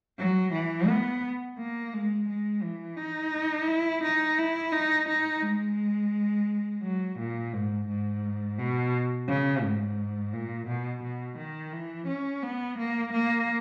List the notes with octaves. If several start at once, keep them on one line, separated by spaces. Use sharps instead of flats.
F#3
E3
B3
A#3
G#3
G#3
E3
D#4
E4
D#4
E4
D#4
D#4
G#3
F#3
A#2
G#2
G#2
B2
C#3
G#2
A#2
B2
B2
D#3
E3
C#4
B3
A#3
A#3